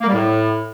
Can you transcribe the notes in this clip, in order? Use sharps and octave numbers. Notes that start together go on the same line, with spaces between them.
A#3
G3
A2